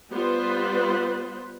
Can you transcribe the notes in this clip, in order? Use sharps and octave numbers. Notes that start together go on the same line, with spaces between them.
G3 B3 F4 B4 C5